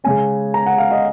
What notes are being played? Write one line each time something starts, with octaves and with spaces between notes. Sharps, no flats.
C#3 G#3 C#4 G#5
A#5
F#5
F5
D#5